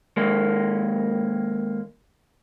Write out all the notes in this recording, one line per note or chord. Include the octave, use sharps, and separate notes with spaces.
D#2 G#3 A#3